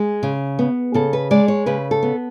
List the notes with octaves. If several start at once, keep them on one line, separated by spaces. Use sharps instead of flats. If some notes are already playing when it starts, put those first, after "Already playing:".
Already playing: G#3 G#4
C#3
B3
C#3 A4
B4
G#3 D5
C#5
C#3 B4
A4
B3